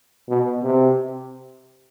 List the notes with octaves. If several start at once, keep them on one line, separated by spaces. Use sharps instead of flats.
B2
C3